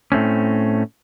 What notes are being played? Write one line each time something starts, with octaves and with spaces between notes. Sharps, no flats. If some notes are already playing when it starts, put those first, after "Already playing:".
A2 A3 C4 C#4